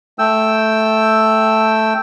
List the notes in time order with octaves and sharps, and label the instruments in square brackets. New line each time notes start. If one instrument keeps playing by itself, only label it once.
[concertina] A3 G5 E6